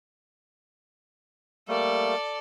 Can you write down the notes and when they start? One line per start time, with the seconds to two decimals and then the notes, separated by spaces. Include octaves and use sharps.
1.68 G3 A3 A#3 A4 D5